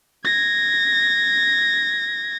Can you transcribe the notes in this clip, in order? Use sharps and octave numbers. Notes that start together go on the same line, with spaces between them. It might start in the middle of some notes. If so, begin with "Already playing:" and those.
G#6 A#6